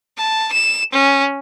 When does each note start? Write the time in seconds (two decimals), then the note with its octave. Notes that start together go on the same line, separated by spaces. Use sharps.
0.17 A5
0.53 E7
0.93 C#4